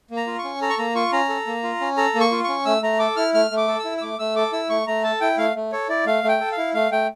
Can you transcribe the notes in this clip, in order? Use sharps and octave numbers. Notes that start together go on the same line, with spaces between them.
A#3
A#5
F4
C#6
C#4
A4 A#5
C#6
A#3 A#5
F4 C#6
C#4 A#5
A4
A#3
F4
C#4
A4 A#5
A#3
C#6
F4
C#4 C#6
A3 E6
A3 A#5
A4 D6
E4 F6
A3 F6
A3
D6
A4
E6
E4
E6
A3 D6
A3 E6
A4 D6
E4 E6
A3 C#6
A3 A#5
A4 A5
E4 G5
A3 F5
A3
A4 C#5
E4 D5
A3 F5
A3 G5
A4
F5
E4
A3 F5
A3 G5